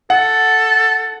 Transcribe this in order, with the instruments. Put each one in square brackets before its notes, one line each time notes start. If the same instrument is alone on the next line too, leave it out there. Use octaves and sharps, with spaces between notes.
[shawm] A4 [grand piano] F#5